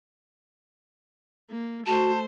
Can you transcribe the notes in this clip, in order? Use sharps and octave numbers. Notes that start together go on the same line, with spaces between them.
A#3
A3 F#4 C5 A5